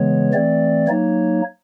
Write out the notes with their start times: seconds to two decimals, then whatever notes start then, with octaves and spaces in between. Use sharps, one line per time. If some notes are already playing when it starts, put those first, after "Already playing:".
Already playing: C#3 E3 G#3 B3 C#5
0.33 E3 A3 C4 D5
0.88 F#3 A#3 D#4 C#5